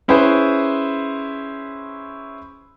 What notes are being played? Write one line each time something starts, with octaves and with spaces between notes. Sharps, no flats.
C#4 E4 G#4 B4 C5